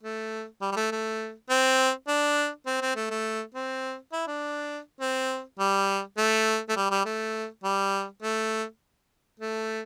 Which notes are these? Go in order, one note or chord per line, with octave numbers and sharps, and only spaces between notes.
A3
G3
G3
A3
A3
C4
D4
C4
C4
A3
A3
C4
E4
D4
C4
G3
A3
A3
G3
G3
A3
G3
A3
A3